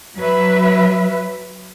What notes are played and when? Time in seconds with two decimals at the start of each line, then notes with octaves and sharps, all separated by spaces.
0.16 F#3 B4 E5